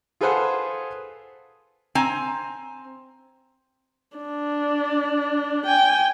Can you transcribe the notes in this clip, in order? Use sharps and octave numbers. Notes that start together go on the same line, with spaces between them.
F4 G#4 A4 B4 C5 F#5
C4 G#5 A#5
D4
G5 G#5